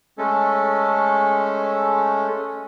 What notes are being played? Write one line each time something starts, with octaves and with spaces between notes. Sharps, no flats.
G#3 A3 C#4 A4